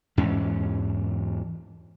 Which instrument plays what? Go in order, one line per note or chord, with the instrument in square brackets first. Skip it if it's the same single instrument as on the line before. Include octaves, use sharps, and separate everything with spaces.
[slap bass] E2 G#2 E3 C#4